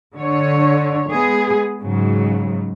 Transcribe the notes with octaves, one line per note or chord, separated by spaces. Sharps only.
D3 C#5
G#3 B3 G#4
G#2 C#3 F#3